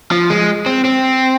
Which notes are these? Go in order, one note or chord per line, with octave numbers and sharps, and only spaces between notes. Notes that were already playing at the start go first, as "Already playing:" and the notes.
F3
G#3
C4
C4